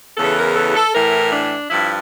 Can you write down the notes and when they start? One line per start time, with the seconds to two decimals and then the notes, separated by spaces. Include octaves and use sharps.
0.17 E2 C#3 E3 A4
0.37 A#4
0.56 A4
0.75 A4
0.94 A2 E3 A#4
1.32 D4
1.70 G2 F3 E4